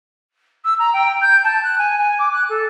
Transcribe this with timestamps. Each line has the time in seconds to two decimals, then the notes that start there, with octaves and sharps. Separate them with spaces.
0.64 E6
0.79 A#5
0.93 G5
1.21 G6
1.43 A5
1.63 F#6
1.78 G#5
1.98 G#5
2.18 D6
2.32 F#6
2.49 A4